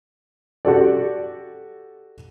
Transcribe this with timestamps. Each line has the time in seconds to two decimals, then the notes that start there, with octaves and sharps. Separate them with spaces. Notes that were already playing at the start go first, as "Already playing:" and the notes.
0.65 F#4 G4 A4 D5